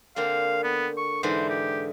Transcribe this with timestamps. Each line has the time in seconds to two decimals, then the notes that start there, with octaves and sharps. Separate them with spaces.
0.16 D3 A#3 C4 F5
0.64 B3
0.97 C#6
1.23 G#2 D3 E3 C5
1.49 G4